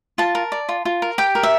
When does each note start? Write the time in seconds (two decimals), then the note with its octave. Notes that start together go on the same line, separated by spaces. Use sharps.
0.18 F4 A5
0.35 A#4
0.52 D5
0.69 F4
0.85 F4
1.02 A#4
1.18 G4 G5
1.35 A#4
1.43 E5